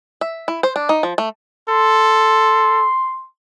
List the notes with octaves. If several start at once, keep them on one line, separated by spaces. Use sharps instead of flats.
E5
E4
C5
D4
D#4
F3
A3
A4 C6